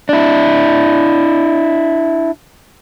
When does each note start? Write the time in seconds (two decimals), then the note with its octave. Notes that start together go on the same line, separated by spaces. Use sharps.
0.09 D4 E4